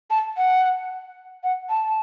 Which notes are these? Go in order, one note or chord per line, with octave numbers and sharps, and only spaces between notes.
A5
F#5
F#5
A5